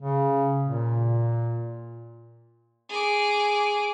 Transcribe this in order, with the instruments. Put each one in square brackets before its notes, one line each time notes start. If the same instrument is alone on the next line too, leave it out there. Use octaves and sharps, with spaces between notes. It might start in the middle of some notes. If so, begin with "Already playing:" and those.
[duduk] C#3
A#2
[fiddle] G#4 D6